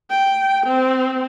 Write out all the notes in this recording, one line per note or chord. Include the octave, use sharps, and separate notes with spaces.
G5
C4